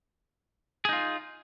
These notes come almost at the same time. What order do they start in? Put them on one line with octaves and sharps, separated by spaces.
G#4 D#4 F4